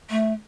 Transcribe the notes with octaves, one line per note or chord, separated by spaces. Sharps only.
A3